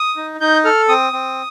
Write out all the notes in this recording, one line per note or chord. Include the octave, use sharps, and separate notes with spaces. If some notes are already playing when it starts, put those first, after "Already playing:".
Already playing: D#6
D#4
D#4 G6
A4 F6
C4 D#6
C4